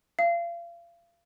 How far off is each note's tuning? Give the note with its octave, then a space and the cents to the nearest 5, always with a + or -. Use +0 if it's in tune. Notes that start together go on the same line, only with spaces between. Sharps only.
F5 -35